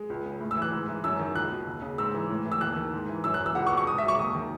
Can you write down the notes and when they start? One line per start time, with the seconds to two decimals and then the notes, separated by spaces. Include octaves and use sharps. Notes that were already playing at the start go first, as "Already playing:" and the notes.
Already playing: G#3
0.10 C#2
0.25 C#3
0.41 A2
0.51 E6
0.56 E3
0.62 F#6
0.72 G#2
0.88 E3
1.04 F#2 E6
1.19 D#3
1.36 C#2 F#6
1.50 B2
1.67 D#2
1.82 C#3
1.98 G#2 E6
2.14 E3
2.30 A2
2.45 E3
2.52 E6
2.61 D#2 F#6
2.76 D#3
2.93 G#2
3.09 E3
3.24 F#2 E6
3.34 F#6
3.41 E3
3.46 E6
3.55 C#2 F#5
3.67 C#6
3.72 B2
3.77 C#6
3.87 G#2 D#6
3.98 F#3 E5
4.08 C#6
4.18 D#2 D#6
4.35 D#3